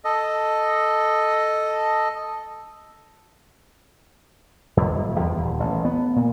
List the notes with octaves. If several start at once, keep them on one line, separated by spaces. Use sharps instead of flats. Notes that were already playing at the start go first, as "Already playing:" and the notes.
A4 D#5
F2
D#1
E2
D#1
A1
B3
A#2